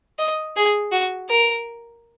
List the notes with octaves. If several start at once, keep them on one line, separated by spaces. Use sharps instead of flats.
D#5
G#4
F#4
A#4